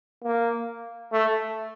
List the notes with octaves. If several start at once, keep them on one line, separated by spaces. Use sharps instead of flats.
A#3
A3